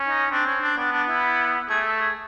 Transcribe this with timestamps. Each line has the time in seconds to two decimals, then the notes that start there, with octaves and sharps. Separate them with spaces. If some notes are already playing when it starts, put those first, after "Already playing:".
Already playing: C#4
0.08 D#4
0.31 C4 D4
0.46 C#4
0.62 D4
0.77 B3 D4
0.92 D4
1.08 E4
1.69 A3 G#4
1.85 A4
2.00 G#4